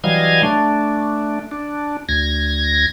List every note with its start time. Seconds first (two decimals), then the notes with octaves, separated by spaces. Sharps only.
0.04 E3 F#3 G3 D#5 F5 G#6
0.43 A3 D4
1.51 D4
2.09 D2 G#6 A#6